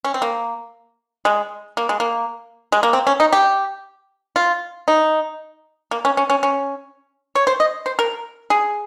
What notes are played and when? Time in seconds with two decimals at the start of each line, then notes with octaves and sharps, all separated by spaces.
0.05 C#4
0.14 C4
0.22 A#3
1.25 G#3
1.77 A#3
1.89 G#3
2.00 A#3
2.72 G#3
2.83 A#3
2.93 C4
3.07 C#4
3.20 D#4
3.33 G4
4.36 F4
4.88 D#4
5.91 A#3
6.05 C#4
6.17 C#4
6.30 C#4
6.43 C#4
7.35 C#5
7.47 C5
7.60 D#5
7.86 C5
7.99 A#4
8.50 G#4